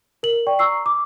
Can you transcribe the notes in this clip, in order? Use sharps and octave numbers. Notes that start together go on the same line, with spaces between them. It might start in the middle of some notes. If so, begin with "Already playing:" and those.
A#4 F#7
D5 G5 C#6
A#5 C#6 E6 C7
D6